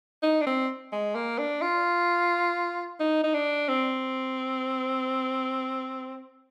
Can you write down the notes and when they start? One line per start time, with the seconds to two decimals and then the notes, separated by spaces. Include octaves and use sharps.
0.23 D#4
0.41 D4
0.47 C4
0.92 G#3
1.15 A#3
1.38 D4
1.62 F4
3.00 D#4
3.24 D#4
3.34 D4
3.68 C4